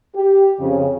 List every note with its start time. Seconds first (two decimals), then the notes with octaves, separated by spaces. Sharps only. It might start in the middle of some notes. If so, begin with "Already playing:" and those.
0.15 G4
0.60 F2 C#3